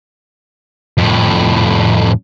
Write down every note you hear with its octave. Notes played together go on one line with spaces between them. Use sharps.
F2 A2